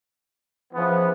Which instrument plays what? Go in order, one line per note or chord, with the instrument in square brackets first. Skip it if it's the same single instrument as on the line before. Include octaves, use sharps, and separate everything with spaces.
[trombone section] C#3 E3 B3 [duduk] F3